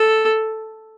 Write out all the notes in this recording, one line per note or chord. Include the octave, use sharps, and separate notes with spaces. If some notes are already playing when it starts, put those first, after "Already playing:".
Already playing: A4